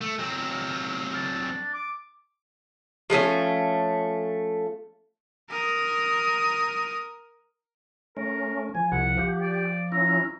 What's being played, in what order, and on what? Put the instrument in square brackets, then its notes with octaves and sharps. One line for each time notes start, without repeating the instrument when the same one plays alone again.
[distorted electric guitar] A3
F#3 C4
[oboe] F5
D4
D6
[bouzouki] F3 G#3 A3 C#4
[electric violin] A#4 D#6
[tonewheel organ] A3 C#4 [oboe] A#4
[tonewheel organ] F3 [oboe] G#5
[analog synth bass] C2 [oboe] F#5
[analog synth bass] F3 [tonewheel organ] G4
[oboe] D5
[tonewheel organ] C#4 E4 [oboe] A#5